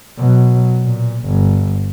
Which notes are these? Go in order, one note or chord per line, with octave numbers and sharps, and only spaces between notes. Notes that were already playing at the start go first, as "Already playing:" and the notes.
B2 F#3
A#2
G1